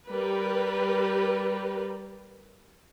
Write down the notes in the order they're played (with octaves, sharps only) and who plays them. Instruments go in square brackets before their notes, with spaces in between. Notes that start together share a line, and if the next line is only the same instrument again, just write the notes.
[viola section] G3 G4 A#4 B4